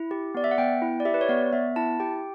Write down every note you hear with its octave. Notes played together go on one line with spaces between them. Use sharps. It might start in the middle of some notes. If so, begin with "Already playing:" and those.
Already playing: E4
G4
B3 D5
E5
F#5
B3 G5
E4
D5
G4 E5
B4
C#5
B3 D5
B3 E5
E4 A5
G4 G5